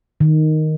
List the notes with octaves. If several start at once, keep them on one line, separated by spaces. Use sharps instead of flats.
D#3